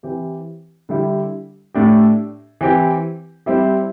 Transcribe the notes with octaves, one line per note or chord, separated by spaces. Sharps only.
E3 C4 G4
D3 G3 E4 G4
A2 A3 D4 G4
E3 C4 G4
G3 C4 E4 G4